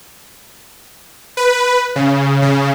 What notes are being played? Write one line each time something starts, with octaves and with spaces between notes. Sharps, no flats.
B4
C#3
C#3